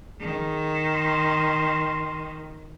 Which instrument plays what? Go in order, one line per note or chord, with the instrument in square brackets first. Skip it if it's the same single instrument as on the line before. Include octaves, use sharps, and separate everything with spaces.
[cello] D#3 [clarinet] G#4
[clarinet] C6